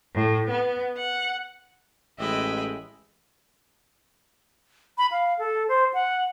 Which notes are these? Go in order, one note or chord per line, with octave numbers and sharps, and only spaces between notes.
A2
B3
F#5
A1 G#3 D#5 E5 G5 B5
B5
F5
A4
C5
F#5